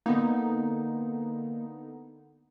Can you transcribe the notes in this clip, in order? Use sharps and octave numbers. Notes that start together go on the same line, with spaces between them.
D3 A#3 B3 D#4